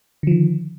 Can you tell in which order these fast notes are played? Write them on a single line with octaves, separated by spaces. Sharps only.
D3 F3 D#3